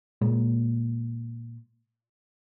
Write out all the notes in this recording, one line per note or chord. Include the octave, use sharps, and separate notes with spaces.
A#2 G#3 A#3